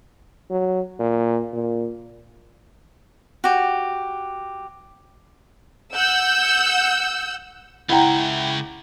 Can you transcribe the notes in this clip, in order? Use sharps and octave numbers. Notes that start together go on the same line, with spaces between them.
F#3
A#2
A#2
F#4 G4
F#5 E6 G6
C#2 E4 F#5 G5 A#5